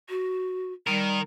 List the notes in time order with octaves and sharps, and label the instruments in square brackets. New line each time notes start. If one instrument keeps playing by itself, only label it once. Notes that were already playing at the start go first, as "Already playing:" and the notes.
[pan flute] F#4
[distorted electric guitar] D#3 A#4 [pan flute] G3